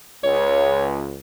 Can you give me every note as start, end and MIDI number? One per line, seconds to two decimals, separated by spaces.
0.23 1.18 37
0.23 0.86 73